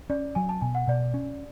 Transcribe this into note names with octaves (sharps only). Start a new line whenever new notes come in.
C#4 D5
F#3 G#5
A5
B2 G#5
F#5
B2 D5
C#4